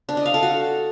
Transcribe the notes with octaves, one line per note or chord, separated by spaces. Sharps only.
D4
D#5
F5
A4
F#4